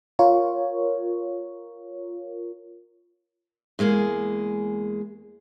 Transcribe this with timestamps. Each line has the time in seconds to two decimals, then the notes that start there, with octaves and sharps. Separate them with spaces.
0.19 F4 A#4 C#5
3.79 E2 G#3 A#3 G#4